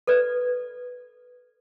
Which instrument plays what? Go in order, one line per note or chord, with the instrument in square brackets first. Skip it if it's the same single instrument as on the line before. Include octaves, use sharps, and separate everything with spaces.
[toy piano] A4 B4 D5